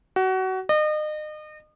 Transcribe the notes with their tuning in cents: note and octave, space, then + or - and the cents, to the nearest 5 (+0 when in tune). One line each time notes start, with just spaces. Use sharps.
F#4 +25
D#5 -35